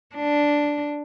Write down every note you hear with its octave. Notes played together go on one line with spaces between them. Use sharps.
D4